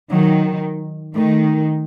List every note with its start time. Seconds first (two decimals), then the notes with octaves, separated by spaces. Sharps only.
0.11 D#3 F#3
1.15 D#3 A3